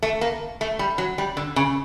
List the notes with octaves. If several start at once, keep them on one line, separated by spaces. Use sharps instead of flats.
A3
A#3
A3
G3
F#3
G3
D3
C#3